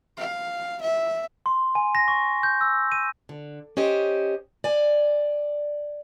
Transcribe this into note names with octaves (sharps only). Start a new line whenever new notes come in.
F5
E5
C6
G#5
A#6
C#6
G6
E6
D#7
D3
C#4 G4 C5 D#5
D5 G#5